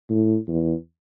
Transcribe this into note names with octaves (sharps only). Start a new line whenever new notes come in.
A2
E2